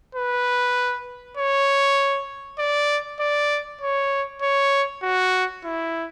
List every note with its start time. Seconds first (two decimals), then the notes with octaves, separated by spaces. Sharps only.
0.15 B4
1.37 C#5
2.58 D5
3.20 D5
3.81 C#5
4.42 C#5
5.02 F#4
5.64 E4